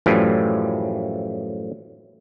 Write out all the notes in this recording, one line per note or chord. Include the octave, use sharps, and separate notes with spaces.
F#2 A2 E3 F3 G3